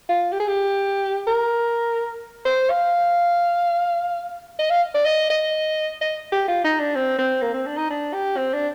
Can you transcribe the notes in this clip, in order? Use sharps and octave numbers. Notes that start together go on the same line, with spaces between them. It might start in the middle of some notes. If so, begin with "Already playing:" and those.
F4
G4
G#4
G4
A#4
C5
F5
D#5
F5
D5
D#5
D#5
D#5
G4
F4
D#4
D4
C4
C4
A#3
C4
D4
D#4
D4
G4
C4
D4